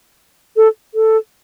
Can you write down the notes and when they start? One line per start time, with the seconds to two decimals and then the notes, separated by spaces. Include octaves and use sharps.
0.57 A4
0.94 A4